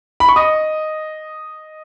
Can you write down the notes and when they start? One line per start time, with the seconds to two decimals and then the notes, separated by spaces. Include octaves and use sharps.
0.20 B5
0.29 C#6
0.36 D#5 D#6